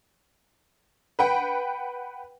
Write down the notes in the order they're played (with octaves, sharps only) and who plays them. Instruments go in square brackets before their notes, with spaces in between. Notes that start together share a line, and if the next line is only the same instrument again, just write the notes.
[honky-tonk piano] B4 F#5 G5